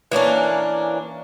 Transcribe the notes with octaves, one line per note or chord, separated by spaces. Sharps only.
E3 A#3 C#4 D4